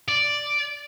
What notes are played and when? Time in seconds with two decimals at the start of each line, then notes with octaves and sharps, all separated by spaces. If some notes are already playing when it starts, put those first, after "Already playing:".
0.08 D5